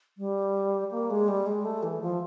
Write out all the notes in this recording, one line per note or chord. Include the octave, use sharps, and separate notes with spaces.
G3
A#3
G#3
G3
G#3
A3
E3
F3